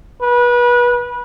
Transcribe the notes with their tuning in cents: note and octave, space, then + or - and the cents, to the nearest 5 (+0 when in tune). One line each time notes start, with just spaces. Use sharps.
B4 -25